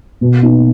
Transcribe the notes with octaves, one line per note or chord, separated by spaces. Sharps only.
B2
B3 D#4